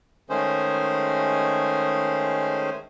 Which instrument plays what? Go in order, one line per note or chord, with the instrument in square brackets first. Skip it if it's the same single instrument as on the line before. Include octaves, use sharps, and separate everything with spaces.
[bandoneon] D#3 G#3 A3 C#4 G#4 C5